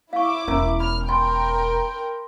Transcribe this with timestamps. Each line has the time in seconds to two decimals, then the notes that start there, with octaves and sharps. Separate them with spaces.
0.13 E4 F5 C#6 D6
0.48 E1 B3 C#4 A#4 A#5
0.80 B5 F6
1.09 A#4 G5 G#5 B5 C6